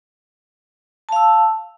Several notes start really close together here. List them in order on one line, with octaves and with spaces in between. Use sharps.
A5 F5 E6